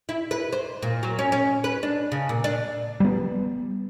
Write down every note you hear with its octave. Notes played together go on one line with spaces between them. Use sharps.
E4
B4
C5
A#2
F#3
C#4
C#4
B4
D4
C#3
A#2
D4
G3 B3